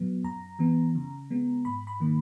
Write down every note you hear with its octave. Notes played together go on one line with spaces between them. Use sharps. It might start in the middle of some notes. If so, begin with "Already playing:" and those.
Already playing: A#2 F#3 B3
F#2 A#5
E3 B3
C#3
G#3 B3
G#2 B5
B5
D#3 A#3